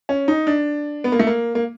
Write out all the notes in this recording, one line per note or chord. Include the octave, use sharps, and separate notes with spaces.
C#4
D#4
D4
B3
A#3
A3
A#3
A#3